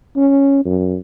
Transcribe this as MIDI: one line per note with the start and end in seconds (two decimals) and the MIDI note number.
0.16 0.64 61
0.65 0.96 42